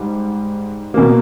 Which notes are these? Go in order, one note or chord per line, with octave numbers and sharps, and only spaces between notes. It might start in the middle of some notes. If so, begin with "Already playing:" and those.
Already playing: G#2 G3
B2 A#3